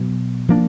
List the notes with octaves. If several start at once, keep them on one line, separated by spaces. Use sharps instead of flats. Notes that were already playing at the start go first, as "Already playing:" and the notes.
Already playing: B2 F#3 B3
F3 A#3 D4